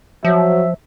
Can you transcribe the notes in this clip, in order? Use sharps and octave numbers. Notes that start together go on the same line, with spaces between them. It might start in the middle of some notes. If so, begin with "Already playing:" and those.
F3 F#3 E5